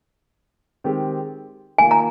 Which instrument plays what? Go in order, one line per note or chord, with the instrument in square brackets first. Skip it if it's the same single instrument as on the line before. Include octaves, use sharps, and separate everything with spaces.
[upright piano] D#3 G#3 C4 G4
[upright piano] D#3 A#3 F4 [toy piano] G#5
[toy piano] A#5